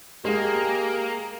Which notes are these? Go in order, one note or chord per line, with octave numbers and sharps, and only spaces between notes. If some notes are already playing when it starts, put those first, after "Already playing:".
G#3 A#3 G4 G#4